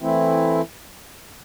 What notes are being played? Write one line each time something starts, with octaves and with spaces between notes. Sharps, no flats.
E3 A3 C4 E4